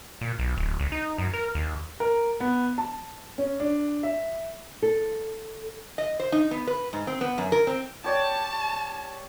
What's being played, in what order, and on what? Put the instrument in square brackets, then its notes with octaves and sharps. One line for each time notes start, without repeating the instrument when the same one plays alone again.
[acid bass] A#2
B1
D1
C#2
D#4
F#2
A#4
D#2
[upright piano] A#4
B3
A5
C#4
D4
E5
[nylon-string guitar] A4
[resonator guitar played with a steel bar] D#5
C5
D#4
B3
B4
G#2
C4
B3
F#2
A#4
C4
[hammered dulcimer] G4 C#5 D5 [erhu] A5